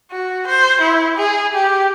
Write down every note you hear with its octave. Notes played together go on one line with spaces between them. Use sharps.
F#4
C5
E4
G#4
G4